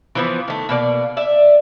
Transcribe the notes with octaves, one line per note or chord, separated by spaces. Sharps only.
E3 F3 B3
D#3 A3
B2 A#3 D5
D5 E5